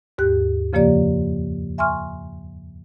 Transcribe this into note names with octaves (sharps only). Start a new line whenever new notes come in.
D#2 G#2 G4 F#6
F2 C#3 F3 A#3 G4 D5
E5 G#5 C6 C#6 F6